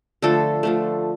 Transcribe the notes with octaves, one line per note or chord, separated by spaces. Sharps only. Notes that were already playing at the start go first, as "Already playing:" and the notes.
D3 F3 A3 A4
D3 F3 A3